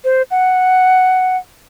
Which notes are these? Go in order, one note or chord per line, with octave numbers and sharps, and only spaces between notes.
C5
F#5